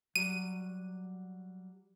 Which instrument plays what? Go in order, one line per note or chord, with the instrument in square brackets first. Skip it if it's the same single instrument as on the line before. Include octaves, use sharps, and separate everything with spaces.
[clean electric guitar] F#3 G3 [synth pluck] D#7